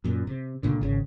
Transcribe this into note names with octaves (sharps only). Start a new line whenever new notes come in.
F#2 A#2
C3
C#2 A#2 D3
G#1 C#3